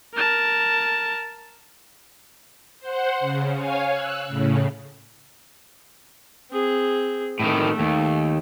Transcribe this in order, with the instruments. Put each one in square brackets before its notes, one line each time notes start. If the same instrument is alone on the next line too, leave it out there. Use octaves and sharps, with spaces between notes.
[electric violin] A#4 A5
[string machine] C5 F#5
C#3
C#5 F5 G#5
E6 F#6
A2 C#3
[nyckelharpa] C4 G#4
[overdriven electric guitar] A2 D#3 [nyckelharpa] A3
[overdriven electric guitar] D#2